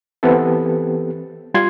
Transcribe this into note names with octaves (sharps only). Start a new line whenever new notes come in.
E3 B3 C4 G4 A4
G3 F4 C6 G#6